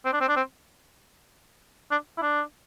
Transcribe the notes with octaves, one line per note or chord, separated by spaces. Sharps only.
C4
D4
C4
D4
C4
D4
E4
D4